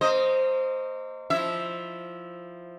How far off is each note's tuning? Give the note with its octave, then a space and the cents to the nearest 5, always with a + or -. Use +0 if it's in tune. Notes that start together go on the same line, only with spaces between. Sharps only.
A#3 -35 C5 +0 D#5 +0
F3 +0 E4 +0 E5 +0